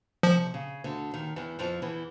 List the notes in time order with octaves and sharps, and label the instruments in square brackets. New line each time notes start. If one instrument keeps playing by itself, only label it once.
[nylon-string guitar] C3 [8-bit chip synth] F3
[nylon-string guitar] C#3
D2 D3
D#2 D#3
E2 E3
F2 F3
E2 E3